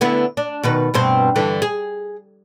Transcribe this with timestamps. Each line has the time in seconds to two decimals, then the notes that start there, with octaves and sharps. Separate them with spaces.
0.01 D3 B3 E4
0.37 D4
0.63 B2 D#3 B4
0.94 G2 B2 C4
1.36 G2 D3 E3
1.62 G#4